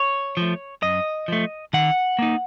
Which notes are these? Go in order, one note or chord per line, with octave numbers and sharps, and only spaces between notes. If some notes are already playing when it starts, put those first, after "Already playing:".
Already playing: C#5
F3 A3
F#2 D#5
F3 A3
D#3 F#5
A#3 D#4